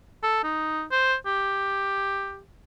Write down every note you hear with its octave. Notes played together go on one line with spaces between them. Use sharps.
A4
D#4
C5
G4